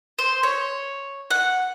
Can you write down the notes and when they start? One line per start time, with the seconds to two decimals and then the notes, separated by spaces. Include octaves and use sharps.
0.19 C5
0.43 C#5
1.31 F#5